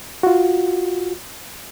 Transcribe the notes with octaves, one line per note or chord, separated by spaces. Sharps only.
F4 F#4